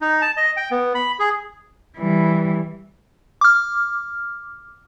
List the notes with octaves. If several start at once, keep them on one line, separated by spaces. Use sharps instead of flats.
D#4
A5
D#5
G5
B3
B5
G#4
E3 G3
D6 F6